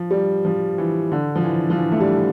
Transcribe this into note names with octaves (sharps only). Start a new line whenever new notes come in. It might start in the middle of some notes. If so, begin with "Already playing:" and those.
Already playing: F3
G3
F3
E3
D3
F3
E3
F3
E3
A3
G3